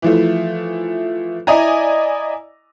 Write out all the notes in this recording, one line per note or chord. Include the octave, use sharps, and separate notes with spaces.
E3 F3 A3
E4 D5 D#5 G#5 A#5